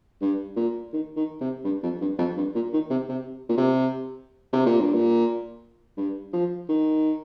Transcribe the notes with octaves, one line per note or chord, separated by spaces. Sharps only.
G2
A#2
D#3
D#3
C3
G2
F2
G2
F2
G2
A#2
D#3
C3
C3
A#2
C3
C3
A#2
G2
A#2
G2
F3
D#3